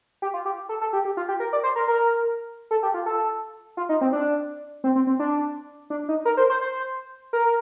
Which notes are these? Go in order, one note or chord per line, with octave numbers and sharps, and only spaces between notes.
G4
F4
G4
A4
A4
G4
G4
F4
G4
A#4
D5
C5
A#4
A#4
A4
G4
F4
A4
F4
D#4
C4
D4
C4
C4
C4
D4
D4
D#4
A#4
C5
C5
C5
A#4